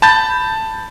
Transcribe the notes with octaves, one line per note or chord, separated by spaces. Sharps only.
A5 B5 G6 A6